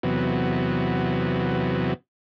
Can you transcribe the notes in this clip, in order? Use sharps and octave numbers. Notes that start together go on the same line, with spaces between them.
E2 C3 F#3 B3